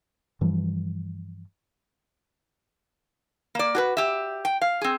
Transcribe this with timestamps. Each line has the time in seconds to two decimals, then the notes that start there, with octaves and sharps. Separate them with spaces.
0.41 G2 E3 F3 G3
3.55 A#3 D5
3.75 F#4 G#4 B4
3.97 G4 E5
4.45 G5
4.61 F5
4.81 C4 G#4